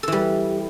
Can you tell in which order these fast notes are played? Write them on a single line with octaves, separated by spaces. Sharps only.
A4 E3 G3